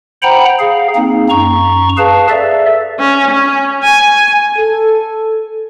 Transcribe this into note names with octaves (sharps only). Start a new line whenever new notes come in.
C5 F#5 G5 A#5 B5
G#4 F5
A#3 C4 D#4
F#2 A#5 C#6
G#4 B4 F5 A5
A4 D5 E5
C#4
C#4
G#5
A4